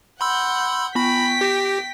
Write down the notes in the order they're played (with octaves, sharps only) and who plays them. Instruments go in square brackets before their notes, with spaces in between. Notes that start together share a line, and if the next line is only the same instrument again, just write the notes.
[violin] F#5 G6 [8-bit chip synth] B5 C6 E6
[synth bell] B3 C#6 A#6 [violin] G5 B6 [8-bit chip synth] B5
[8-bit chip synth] G4 [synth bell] G6 A#6 D7